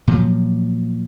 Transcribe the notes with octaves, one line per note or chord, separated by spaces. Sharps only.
A#2 F3 F#3